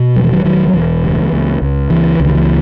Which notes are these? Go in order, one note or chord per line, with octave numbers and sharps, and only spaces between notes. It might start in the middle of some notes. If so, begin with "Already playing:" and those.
Already playing: B2
E1 F#3
E3
D#3 F#3
E1 D#3 F#3
F#3
E1 E3
C#2
C#2
C#2
C#2 E3
C#2
D#3
E3